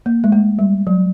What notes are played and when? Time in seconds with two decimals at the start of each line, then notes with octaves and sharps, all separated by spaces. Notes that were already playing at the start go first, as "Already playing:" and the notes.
0.06 A#3
0.24 G#3
0.32 A3
0.59 G3
0.87 F#3